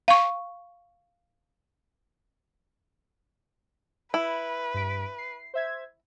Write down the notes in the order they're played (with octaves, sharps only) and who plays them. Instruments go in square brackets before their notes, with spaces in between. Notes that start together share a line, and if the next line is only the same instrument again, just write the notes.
[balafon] F5 C#6
[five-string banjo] E4 [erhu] B4
[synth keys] G2 B6 D7
C7
C5 E5 G#6